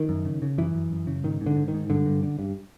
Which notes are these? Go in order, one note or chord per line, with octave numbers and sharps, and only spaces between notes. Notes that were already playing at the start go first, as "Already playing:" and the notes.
Already playing: D#3
F#2
C#3
C#3
F#2 E3
F#2
F#2
C#3
G#2 D#3
G#2
D3
G#2
D#3
G#2
G2 D3
G2
D3
G2